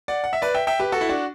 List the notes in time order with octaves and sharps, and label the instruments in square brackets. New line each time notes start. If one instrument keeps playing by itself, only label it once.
[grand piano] D5 F#5
F#5
E5
B4 D5
E5 G5
E5 G5
G4 B4
F#4 A4
E4
D4 F#4